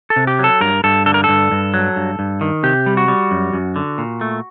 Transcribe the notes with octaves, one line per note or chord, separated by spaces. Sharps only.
A4
C3
G4
F#3 A4
G2 A#4
G2 A4
D3 A4
A#4
G2 A4
G2
F#3
G2
G2
D#3
C3 G4
G3
F#4
G3
F#2
F#2
D3
A#2
A3